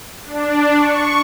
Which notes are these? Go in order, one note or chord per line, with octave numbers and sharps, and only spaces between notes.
D4
C#6